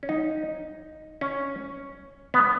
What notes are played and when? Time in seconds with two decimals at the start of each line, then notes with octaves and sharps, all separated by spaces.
0.03 C#4
0.09 D#4
1.21 C#4
2.34 B3